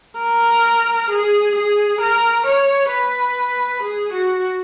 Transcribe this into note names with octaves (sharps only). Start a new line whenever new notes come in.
A#4
G#4
G#4
A#4
C#5
B4
G#4
F#4